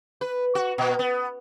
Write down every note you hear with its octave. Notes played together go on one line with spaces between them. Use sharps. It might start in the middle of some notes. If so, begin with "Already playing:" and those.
B4
F#4
A#2
B3